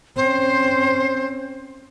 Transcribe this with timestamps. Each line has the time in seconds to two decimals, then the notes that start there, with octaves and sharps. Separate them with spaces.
0.17 C4 C#4 C5